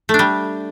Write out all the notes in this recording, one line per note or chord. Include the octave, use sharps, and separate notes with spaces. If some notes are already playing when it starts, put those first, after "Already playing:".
A3
D4
G3